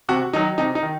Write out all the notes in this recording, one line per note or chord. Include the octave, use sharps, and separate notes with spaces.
C3 F#4
D#3 F#3 D#4
C3 D#4
D#4
D#3